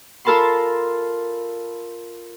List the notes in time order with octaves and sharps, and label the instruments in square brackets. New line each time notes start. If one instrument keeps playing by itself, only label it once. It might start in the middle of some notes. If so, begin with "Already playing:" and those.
[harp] F4 A4 A#4 A5 B5 C6